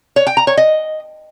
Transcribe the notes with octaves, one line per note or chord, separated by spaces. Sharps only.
C#5
G5
A#5
C#5
D#5